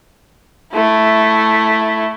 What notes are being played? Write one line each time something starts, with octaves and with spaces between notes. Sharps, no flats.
A3 E4